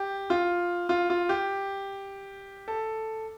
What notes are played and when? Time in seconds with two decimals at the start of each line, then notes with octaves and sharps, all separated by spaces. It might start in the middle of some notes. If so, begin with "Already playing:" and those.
Already playing: G4
0.30 F4
0.89 F4
1.10 F4
1.29 G4
2.68 A4